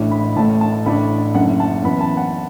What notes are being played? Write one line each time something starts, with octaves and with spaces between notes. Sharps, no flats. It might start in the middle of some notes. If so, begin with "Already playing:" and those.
Already playing: A1 A2 A3 D4
B5
A1 A2 A3 A5
A5
A1 A2 A3 D4 B5
F#1 F#2 D3 F#5
A5
F#2 E3 B3 B5
A5
F#5